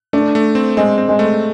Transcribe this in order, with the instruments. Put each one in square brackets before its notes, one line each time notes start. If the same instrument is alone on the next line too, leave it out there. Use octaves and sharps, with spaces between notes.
[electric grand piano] A3 [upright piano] D4
[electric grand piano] A3
C4
[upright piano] G#3 [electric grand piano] C4
[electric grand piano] C4
[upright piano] G#3
[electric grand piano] A3